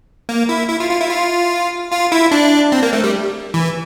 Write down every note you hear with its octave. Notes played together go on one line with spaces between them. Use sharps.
A#3
E4
E4
F4
F4
E4
F4
F4
E4
D4
C4
A#3
A3
G3
E3